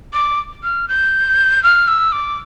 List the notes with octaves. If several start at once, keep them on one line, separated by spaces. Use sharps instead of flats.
D6
F6
G6
F6
E6
D6